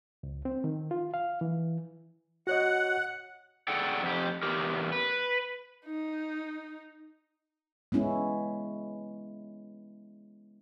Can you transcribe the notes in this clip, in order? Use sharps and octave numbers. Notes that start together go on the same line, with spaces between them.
C#2
C4
D#3
F4
F5
E3
F#4 C#5 D#5 F#5
G#4 A4 D5 F#5 G5
F2 G4
E2 G4 A#4
B4
D#4
G#3 B3 C#4 E4